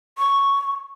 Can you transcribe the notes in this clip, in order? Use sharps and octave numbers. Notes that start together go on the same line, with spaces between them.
C#6